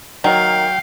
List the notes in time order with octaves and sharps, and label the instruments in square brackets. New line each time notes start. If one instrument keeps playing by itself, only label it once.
[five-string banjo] D#3 [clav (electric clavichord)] F#3 [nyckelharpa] F5 [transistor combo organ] G5